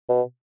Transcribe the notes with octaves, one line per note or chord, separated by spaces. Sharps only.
B2